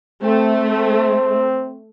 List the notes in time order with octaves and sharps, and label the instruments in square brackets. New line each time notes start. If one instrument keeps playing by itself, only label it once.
[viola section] A3 [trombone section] C4